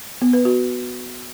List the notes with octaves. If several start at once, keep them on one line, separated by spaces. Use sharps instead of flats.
B3
B4
F#4